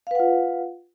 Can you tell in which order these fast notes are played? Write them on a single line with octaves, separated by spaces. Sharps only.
F5 B4 F#5 F4